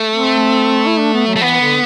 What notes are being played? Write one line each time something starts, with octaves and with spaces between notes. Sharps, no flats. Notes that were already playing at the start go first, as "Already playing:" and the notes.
Already playing: A3
C4
E4
D4
B3
F#3
A3
E3 B3
D3